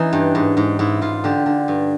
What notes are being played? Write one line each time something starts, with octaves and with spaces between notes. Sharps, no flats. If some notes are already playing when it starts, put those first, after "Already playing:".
Already playing: E3 C#4 D#4
G2
G#2
G#2
G#2 E4
G#2 F4
D3 G4
D3
G2